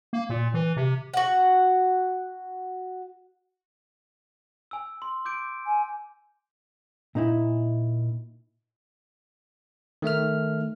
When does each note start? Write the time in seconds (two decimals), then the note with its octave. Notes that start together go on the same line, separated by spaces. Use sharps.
0.13 A#3
0.30 A#2
0.54 E3
0.76 C3
1.14 F#4 F#5
4.71 G#5 E6
5.02 C6
5.25 D6 G6 D7
5.67 G#5
7.15 A#2 D#4 E4
10.02 D#3 A3 E5 F6